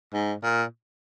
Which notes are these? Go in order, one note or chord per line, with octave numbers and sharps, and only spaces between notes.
G#2
A#2